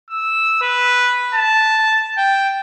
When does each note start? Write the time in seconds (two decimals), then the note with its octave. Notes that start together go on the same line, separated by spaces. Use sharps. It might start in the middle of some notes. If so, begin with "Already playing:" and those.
0.10 E6
0.61 B4
1.35 A5
2.18 G5